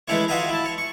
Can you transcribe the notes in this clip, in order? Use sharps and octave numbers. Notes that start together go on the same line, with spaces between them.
E3 G#3 A3 C#4 E4 C#5
F4 F#4 D#5 E5 G#5 A#5
E4 A5
C#5
C#6